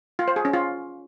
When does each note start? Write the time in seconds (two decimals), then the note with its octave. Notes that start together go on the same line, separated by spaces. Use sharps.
0.19 F4
0.28 C5
0.36 G#4
0.45 C#4
0.53 F4